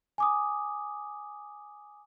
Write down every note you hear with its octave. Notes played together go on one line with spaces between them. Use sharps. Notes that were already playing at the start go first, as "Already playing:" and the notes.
G#5 D6 D#6